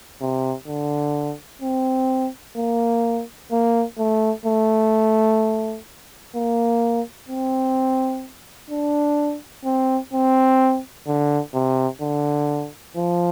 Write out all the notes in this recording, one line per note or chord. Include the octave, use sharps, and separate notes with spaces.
C3
D3
C4
A#3
A#3
A3
A3
A#3
C4
D4
C4
C4
D3
C3
D3
F3